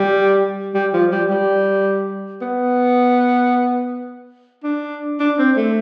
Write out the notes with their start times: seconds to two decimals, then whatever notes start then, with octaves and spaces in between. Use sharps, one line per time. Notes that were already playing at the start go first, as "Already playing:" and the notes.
Already playing: G3
0.74 G3
0.94 F3
1.12 G3
1.30 G3
2.41 B3
4.64 D4
5.20 D4
5.38 C4
5.57 A3